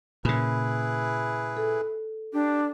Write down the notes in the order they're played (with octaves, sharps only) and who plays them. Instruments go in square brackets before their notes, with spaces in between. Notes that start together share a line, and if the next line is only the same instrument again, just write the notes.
[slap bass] A#2 C#3 [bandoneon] E4 G#4 B4
[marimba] A4
[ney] D4 [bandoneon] G4